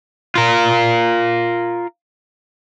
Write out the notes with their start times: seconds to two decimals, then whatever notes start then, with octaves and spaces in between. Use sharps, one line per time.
0.35 F4 A#4